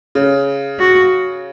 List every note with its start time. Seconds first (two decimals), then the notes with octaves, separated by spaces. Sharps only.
0.15 C#3
0.79 F#4